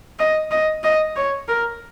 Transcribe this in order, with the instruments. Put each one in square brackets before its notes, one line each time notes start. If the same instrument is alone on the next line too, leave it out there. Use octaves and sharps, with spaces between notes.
[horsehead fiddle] D#5
D#5
D#5
C#5
A#4